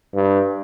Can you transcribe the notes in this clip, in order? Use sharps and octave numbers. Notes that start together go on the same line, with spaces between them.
G2